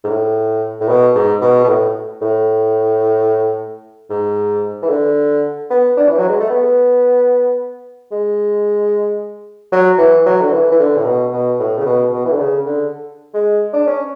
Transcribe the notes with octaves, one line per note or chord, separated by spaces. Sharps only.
G#2
A2
A2
B2
G#2
B2
B2
A2
A2
G#2
E3
D3
B3
D4
E3
F#3
G#3
A3
B3
G#3
F#3
E3
F#3
D3
E3
E3
D3
A2
B2
B2
A2
C#3
B2
B2
E3
D3
C#3
D3
G#3
D4
C#4